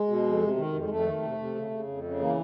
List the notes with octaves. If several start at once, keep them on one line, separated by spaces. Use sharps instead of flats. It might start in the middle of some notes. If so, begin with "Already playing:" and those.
Already playing: G#3
B2
F2
C3
D#3
F2
G#3
F2 A3
D#3
C3
C3
C#3
C#3
F2
C#3
E3 A#3